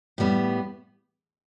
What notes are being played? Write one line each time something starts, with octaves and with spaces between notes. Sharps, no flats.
A2 G3 B3